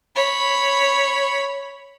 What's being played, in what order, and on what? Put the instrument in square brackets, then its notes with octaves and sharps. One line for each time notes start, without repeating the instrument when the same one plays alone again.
[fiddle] C#5 B5